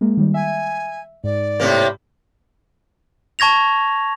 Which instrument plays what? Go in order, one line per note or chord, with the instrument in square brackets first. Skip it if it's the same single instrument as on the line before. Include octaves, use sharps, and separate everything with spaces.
[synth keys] G#3 A#3
D#3 G3
[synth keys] E5 [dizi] G#5
[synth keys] G#2 [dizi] D5
[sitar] A2 C3 A#3
[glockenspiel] A5 C#6 G#6 A#6 F7